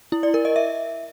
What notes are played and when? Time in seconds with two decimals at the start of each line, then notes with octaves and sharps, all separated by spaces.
0.12 E4
0.23 D5
0.34 A#4
0.45 D#5
0.56 E5